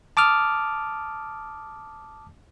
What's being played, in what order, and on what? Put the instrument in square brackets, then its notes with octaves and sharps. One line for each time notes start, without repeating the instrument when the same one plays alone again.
[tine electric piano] A5 D6 D#6 F6